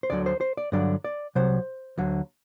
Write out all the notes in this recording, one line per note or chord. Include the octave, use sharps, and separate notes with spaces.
C5
D2 D3 F#3 D5
C5
C5
D5
G2 D3 F#3 D5
D5
C2 C3 F#3 C5
D2 D3 F#3